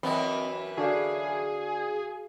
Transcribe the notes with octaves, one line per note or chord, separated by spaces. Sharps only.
F#2 E3 B3 C4 D#5 B5
D3 D4 F#4 G#4 F5